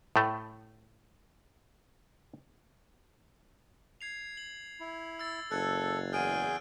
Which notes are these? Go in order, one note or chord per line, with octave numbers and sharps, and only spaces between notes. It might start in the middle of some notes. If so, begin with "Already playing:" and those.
A2 A3
G#6 C7 F7
F#7
E4
E6 A6
F#1 A4 E6 F#6 G#6
E2 G#4 F6 G6 D7 D#7